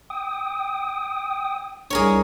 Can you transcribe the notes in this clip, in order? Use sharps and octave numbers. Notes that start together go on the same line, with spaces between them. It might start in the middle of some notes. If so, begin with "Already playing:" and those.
G5 D#6
C2 D4 G#4 A#4 C#5